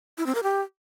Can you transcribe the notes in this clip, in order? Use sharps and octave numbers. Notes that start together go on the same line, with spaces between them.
E4
C4
A#4
G4